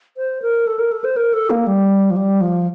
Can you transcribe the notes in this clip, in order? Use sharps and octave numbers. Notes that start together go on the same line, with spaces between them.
C5
A#4
A4
A#4
A4
C5
A#4
A4
A#3
G3
F3
G3
F3